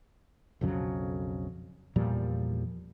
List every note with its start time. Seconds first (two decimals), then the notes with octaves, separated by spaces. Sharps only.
0.61 B1 F2 C#3 F#3
1.96 E2 A#2 F3 G3